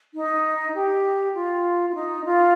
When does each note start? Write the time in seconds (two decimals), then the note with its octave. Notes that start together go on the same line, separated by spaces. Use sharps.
0.14 D#4
0.74 G4
1.34 F4
1.89 F4
1.95 D#4
2.25 F4